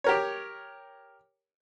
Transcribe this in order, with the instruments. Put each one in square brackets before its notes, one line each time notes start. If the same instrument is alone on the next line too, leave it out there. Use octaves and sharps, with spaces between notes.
[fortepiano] G4 A#4 C#5